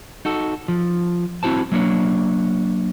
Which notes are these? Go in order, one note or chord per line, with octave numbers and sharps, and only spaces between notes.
D#4 F#4 A4
F3
C4 E4 F#4 C5 A5
F#3 A#3 D4 C#5